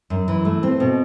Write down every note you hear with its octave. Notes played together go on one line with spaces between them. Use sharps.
F#2
E3
A3
C4
B2